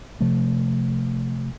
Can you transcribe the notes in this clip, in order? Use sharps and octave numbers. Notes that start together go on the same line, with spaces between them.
C3 F3 A3